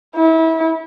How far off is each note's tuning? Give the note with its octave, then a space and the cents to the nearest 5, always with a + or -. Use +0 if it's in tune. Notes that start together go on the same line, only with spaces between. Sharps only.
E4 -30